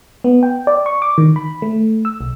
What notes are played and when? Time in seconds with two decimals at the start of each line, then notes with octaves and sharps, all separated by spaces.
0.24 B3
0.43 G5
0.67 D5
0.86 C#6
1.02 D6
1.18 D#3
1.36 B5
1.62 A3
2.05 E6
2.21 B1